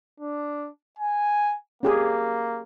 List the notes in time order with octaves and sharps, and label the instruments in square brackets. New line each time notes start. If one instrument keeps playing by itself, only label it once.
[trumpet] D4
G#5
[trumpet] A#3 [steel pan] C#4 G4 G#4